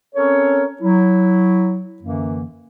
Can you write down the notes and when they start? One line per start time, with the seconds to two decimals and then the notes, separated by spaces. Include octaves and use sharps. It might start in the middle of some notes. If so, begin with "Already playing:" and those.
0.15 C4 C#4 A4 A#4 C#5
0.82 F#3 E4
2.03 F#2 D3 E3 A#3